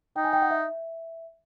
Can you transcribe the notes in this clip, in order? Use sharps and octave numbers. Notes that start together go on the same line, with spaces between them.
D#4 G5
G#5
G5
F#5
E5